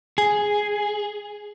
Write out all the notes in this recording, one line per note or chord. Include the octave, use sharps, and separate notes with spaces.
G#4